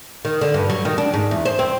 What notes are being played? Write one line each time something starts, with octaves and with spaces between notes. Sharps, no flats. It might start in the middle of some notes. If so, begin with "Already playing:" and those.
D#3
D3
G2
F#3
D#3
D4
G#2
E2
C5
C4